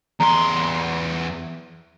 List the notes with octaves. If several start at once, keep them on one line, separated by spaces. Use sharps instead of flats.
E2 A#5 C6